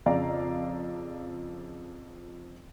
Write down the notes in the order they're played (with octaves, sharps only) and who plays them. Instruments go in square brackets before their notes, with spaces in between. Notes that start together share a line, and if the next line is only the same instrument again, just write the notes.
[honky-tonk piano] F2 C#3 F3 D5 F5 A#5